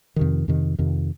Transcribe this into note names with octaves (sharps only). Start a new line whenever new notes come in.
F2 C3 D#3
F2 C3 D#3
F2 C3 D#3